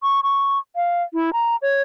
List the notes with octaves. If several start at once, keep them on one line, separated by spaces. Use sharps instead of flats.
C#6
C#6
F5
E4
A#5
C#5